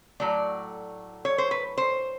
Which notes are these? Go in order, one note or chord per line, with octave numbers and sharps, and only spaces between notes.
A2 F#3 A3 D5
C#5
C5
B4
C5